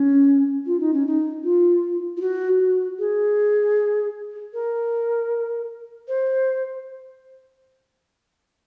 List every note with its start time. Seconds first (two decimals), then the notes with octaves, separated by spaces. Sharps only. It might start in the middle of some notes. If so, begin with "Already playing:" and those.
Already playing: C#4
0.66 F4
0.80 D#4
0.93 C#4
1.07 D#4
1.44 F4
2.17 F4
2.21 F#4
2.60 F#4
2.99 G#4
4.53 A#4
6.08 C5